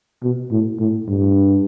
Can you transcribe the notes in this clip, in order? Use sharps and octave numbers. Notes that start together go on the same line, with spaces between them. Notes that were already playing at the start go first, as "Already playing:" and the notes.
B2
A2
A2
G2